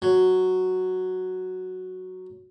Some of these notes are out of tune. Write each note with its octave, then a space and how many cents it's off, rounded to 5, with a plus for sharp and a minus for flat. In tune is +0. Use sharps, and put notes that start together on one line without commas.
F#3 +0